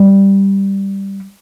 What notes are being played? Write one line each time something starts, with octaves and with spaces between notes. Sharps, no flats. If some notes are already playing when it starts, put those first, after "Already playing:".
Already playing: G3